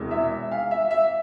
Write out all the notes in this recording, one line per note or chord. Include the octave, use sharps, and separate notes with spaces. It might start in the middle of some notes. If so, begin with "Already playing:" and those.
Already playing: E1 E2 C3
E5
F5
E5
E5